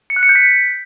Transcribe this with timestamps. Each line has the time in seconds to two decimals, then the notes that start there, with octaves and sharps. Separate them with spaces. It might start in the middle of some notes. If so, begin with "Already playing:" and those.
0.10 C#7
0.16 F#6
0.23 C#7
0.29 G6
0.36 B6